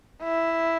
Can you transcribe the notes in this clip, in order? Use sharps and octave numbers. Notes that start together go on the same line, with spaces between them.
E4